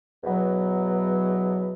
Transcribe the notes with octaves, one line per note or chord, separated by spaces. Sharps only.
E2 B2 F#3 B3